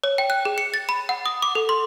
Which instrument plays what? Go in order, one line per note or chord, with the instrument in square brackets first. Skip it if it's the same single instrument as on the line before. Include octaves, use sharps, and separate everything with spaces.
[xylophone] C#5
G5
F#6
G#4
C#7
A6
B5
F#5
D#6
D6
A4
C6